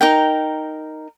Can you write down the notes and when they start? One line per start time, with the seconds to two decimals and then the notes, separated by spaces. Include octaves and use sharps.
0.01 D#4 A#4 G5